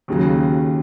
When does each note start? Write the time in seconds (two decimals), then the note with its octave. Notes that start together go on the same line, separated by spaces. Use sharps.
0.08 D#2 C#3 F#3